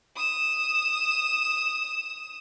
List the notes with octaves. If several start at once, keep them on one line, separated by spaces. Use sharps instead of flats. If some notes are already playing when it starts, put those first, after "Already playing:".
D#6 E7